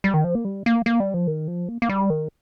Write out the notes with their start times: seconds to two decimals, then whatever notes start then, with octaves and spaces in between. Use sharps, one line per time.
0.04 G3
0.14 D#3
0.24 F3
0.35 A#3
0.45 G3
0.66 A#3
0.86 A#3
1.00 G3
1.14 F3
1.27 D#3
1.48 F3
1.69 A#3
1.82 A#3
1.89 G3
2.10 D#3